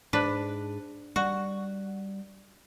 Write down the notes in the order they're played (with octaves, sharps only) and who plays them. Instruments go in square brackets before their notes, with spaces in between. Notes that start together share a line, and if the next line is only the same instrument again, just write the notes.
[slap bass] G#2 [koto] D4 B4
[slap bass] G3 [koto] F#4